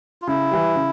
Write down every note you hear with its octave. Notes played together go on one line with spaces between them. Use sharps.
F4
C#3 E4
E3 G3
C#3